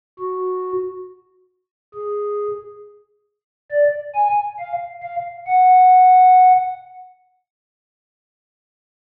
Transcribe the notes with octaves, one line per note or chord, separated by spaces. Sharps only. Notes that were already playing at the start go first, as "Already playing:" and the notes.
F#4
G#4
D5
G#5
F5
F5
F#5